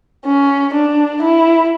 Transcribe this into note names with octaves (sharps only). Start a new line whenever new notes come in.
C#4
D4
E4